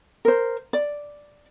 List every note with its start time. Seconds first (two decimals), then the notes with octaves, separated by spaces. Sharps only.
0.25 A#4 C5
0.73 D5